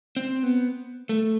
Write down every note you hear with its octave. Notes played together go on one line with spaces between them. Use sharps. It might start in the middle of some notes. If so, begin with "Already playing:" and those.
C4
B3
A3